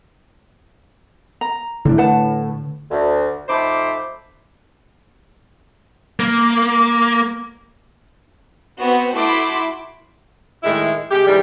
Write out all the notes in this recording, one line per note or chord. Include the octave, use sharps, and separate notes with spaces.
A#5
A2 D3 C4 D4
B4 F#5 A5
D2
F2 A3 D#4 C5 B5 D6
A#3
B3 C4 F#4
A3 E4 F#4 B5 C6 D6
A2 D#3 G#3 E4
C3 G#3 G4
G#2 E3 G3